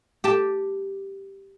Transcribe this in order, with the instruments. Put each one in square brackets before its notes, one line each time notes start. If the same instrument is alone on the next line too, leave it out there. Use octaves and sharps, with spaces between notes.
[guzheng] G4 G5 A5